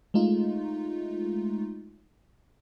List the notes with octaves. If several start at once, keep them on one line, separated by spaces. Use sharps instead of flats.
G#3 A3 D#4 F4